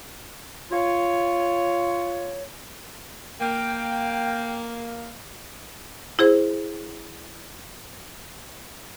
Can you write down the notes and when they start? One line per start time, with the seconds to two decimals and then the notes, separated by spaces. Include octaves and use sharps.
0.71 F4 C#5
3.41 A#3 G5
6.19 E4 G#4 C5